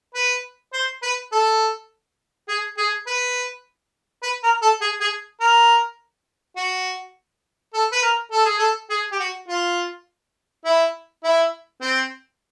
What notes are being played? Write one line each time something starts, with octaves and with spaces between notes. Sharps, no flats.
B4
C5
B4
A4
G#4
G#4
B4
B4
A#4
A4
G#4
G#4
A#4
F#4
A4
B4
A#4
A4
G#4
A4
G#4
G4
F#4
F4
E4
E4
C4